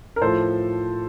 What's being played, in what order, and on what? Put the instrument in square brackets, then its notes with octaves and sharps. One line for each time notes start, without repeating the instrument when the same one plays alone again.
[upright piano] A#4
A2 F3 A4 C5